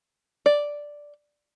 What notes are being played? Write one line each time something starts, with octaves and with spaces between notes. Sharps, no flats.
D5